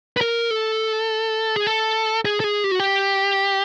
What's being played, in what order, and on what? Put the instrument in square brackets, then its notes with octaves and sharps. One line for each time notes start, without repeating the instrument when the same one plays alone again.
[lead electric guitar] B4
A#4
A4
G#4
A4
G#4
A4
G#4
G4
F#4
G4